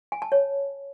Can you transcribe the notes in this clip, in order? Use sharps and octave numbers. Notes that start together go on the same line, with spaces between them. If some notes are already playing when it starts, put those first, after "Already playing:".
G#5
A5
C#5